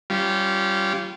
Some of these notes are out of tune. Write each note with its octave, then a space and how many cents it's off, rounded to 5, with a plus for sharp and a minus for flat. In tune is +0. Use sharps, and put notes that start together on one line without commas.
G3 -15 C#4 +0 F4 -25